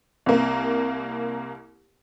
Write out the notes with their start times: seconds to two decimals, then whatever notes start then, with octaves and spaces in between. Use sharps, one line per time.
0.26 C2 A#3